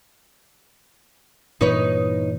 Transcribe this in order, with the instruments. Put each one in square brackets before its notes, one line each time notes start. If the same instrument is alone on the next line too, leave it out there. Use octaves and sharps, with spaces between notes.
[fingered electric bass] G2 A#2 E3 [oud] D#4 B4 C#5